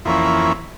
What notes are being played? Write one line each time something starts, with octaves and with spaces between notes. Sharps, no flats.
F2 E3 A#3 C#4 E4